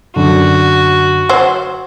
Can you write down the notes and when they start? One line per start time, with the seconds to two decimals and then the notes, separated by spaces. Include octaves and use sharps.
0.16 F#2 D3 F#4
1.29 F#3 C5